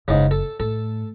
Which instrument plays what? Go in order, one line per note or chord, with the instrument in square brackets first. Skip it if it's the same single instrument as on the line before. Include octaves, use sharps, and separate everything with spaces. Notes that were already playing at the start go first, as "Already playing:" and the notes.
[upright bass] F#1 [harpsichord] G#2 C#3
[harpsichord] A4
[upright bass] A2 [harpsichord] A4